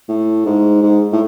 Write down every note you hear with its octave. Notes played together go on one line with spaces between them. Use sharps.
A2
G#2
G#2
A2